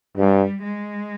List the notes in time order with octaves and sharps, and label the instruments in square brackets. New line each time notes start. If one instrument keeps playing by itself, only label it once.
[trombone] G2 [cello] G3
[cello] G#3